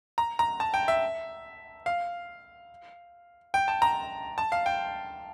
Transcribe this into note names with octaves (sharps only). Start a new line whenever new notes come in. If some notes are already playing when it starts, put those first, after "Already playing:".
A#5
A#5
A5
G5
E5
F5
G5
A5
A#5
A5
F5
G5